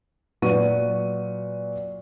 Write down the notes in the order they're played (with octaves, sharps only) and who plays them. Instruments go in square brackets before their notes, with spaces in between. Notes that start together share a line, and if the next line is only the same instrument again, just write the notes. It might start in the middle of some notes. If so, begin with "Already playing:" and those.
[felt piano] A#2 F#3 F#4 B4 C#6 D#7